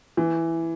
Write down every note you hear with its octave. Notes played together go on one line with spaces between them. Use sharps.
E3